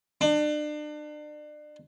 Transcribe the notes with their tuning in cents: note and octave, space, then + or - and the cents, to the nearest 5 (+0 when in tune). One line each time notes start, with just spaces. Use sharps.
D4 +35